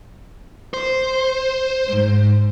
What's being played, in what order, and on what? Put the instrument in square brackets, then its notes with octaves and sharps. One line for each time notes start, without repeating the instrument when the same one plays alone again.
[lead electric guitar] C5
[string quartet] G#2